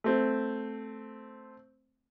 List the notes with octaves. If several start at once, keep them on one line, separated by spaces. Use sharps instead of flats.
A3 C4